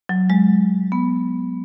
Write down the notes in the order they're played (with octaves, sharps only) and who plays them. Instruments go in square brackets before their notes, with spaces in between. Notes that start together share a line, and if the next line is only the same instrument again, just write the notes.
[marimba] F#3
G#3
B3